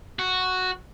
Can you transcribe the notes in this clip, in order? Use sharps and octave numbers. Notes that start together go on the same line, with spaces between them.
F#4